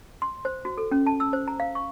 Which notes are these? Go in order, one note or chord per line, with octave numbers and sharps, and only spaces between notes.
C6
C5
F#4
A4
C#4
A5
E6
C5
A#5
F5
C#6